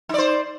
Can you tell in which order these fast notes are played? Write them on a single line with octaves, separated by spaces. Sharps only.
D#4 D5 C5